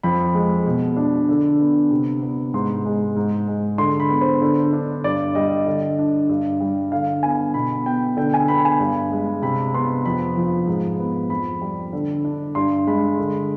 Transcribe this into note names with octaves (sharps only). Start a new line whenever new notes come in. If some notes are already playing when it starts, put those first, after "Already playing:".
F2 B5
G#3
B2
D4
D3
B3
C3
B3
G#2 C6
G#3
G#2
G#3
D3 C6
B5
B3
C5
D3
D4
G2 D5
G3 D#5
D3
D4
G2
G3
D3 F5
B3 G#5
B2 B5
B3 G5
D3 G5
G#5
B3 B5
G#5
G2
G#3
C3 B5
B3 C6
F2 B5
F3
G#2
B3
F2 B5
G3
D3
D4
G2 C6
G#3 B5
D3